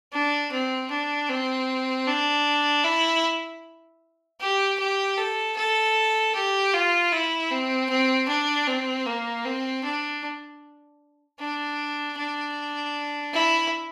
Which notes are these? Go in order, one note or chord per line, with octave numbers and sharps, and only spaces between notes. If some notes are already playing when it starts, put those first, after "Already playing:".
D4
C4
D4
C4
D4
E4
G4
G4
A4
A4
G4
F4
E4
C4
C4
D4
C4
A#3
C4
D4
D4
D4
E4